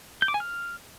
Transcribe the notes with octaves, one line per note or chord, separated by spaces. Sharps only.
G6
D6
G#5
F6